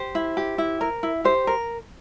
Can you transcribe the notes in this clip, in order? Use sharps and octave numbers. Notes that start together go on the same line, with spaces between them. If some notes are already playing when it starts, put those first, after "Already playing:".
Already playing: G4 C5
E4
G4
E4
A#4
E4
G4 C5
A#4